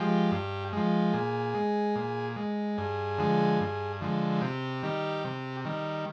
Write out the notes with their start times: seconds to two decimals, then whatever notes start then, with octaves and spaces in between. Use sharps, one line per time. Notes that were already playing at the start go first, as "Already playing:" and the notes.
Already playing: F3 G#3 G4
0.32 G2
0.73 F3 G#3
1.13 A#2 G#4
1.54 G#3
1.95 A#2
2.36 G#3
2.78 G2 G#4
3.18 D3 F3 G#3
3.60 G2
4.01 D3 F3 G#3
4.42 C3 G4
4.83 D#3 G3
5.24 C3
5.65 D#3 G3